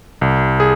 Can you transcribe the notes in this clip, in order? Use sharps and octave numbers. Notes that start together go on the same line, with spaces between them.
C2
G#4